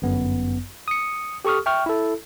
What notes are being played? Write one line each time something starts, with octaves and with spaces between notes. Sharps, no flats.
G1 F#2 B3
D#6 C#7
G4 A4 C#6 D#6 F6
E5 G5 C#6 F6
E4 A4